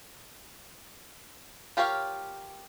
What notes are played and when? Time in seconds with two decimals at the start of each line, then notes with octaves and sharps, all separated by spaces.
1.77 F4 G4 A#4 C#5 F5